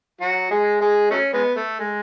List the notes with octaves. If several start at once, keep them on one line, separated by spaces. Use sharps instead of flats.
F#3 F#4
G#3 G#4
G#3 G#4
F#3 A3 C#4
G#3 B3
A3
G#3